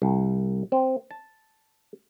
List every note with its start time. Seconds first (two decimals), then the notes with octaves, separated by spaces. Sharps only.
0.02 C2
0.72 C4
1.11 A5